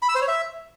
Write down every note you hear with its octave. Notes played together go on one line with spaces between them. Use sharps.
B5
E6
C5
C#5
E5